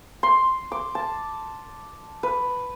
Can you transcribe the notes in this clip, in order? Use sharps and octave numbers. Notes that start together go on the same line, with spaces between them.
C6
D6
A5
B4